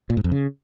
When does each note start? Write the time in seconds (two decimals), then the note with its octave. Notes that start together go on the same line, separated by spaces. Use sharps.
0.10 A#2
0.17 G#2
0.24 F2
0.32 C#3